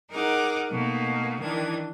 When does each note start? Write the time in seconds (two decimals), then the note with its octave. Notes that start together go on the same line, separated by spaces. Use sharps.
0.10 D#4 G#4 A#4 F#5 A#5 D6
0.71 B2 A3 A#3 D#4
1.40 D#3 E3 D4 A#4 G#6